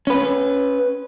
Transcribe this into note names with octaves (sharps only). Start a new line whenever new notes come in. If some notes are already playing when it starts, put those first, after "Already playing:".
C#4 B4